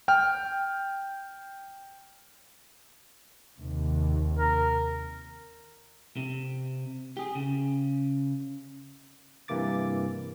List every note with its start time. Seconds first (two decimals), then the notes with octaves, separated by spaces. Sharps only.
0.08 G5 F6
3.58 D#2 C3
4.39 A#4
6.17 C3
7.17 G4 G#4
7.35 C#3
9.48 G2 C3 E3 A#3 D6 A6